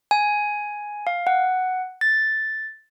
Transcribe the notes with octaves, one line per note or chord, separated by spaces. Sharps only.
G#5
F5
F#5
A6